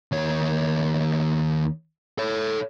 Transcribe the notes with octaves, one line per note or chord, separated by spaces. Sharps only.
D#2 C#5
A4 C#5